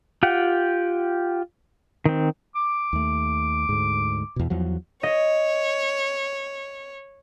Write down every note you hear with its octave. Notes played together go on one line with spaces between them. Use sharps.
F4 G4 F#5 G5
D#3 C4
D6
D#2 A3
D2 G#2
E2 B2
E2 F3 F#3
C#5 D#5